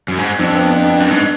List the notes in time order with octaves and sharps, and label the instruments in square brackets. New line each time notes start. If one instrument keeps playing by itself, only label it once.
[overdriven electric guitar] F#2
G#2
[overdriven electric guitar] F2 [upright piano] D4
[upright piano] B3
D4
B3
D4
[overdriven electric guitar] F#2
G#2